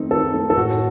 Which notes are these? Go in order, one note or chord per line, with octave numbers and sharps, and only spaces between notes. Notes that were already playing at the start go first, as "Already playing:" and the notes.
Already playing: D#3 A3 C4 D#4
D#3 A4
A3 C4
A4
A2 F#4